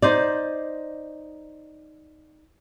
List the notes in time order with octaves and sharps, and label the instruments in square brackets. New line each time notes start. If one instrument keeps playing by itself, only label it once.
[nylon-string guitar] D#4 C5 D5